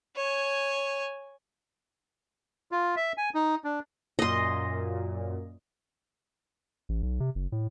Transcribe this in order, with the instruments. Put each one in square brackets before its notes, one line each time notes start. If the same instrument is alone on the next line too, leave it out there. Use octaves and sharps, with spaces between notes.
[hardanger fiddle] C#5 G#5
[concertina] F4
E5
G#5
D#4
D4
[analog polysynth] F#2 A#2 [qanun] D#5 C6
[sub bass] A1
B1
C3
F#1
A2